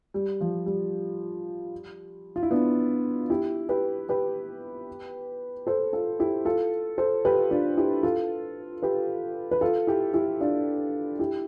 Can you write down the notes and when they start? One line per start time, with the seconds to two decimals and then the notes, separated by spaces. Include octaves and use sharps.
0.14 G3
0.41 F3
0.66 G3
2.36 F4
2.43 E4
2.51 B3 D4
3.30 E4 G4
3.69 G4 B4
4.09 G4 B4
5.67 A4 C5
5.93 F4 A4
6.20 E4 G4
6.45 F4 A4
6.98 A4 C5
7.25 G4 B4
7.51 D4 F4
7.77 E4 G4
8.03 F4 A4
8.82 G4 B4
9.51 B4
9.61 F4 A4
9.87 E4 G4
10.14 E4 G4
10.41 D4 F4
11.19 E4 G4